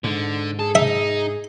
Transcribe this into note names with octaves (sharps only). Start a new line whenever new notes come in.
G#2 D3
G#4 A4
D#4 E5